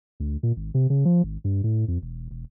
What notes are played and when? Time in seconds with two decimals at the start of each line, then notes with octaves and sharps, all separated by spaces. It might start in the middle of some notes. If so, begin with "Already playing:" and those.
0.20 D2
0.43 A#2
0.57 G#1
0.74 C3
0.90 C#3
1.05 F3
1.24 G#1
1.44 G2
1.64 A2
1.88 F2
2.02 E1
2.31 E1